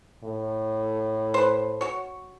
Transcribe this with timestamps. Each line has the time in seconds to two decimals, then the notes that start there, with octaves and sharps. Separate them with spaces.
0.24 A2
1.34 B4 C5
1.81 F#4 C#5